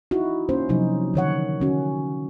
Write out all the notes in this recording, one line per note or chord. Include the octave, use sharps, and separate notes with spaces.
D#4 E4 F#4
A#3 C#4 C5
C3 F3 F#3 D#4
D3 D#3 C#5 F#5
D3 C#4 F#4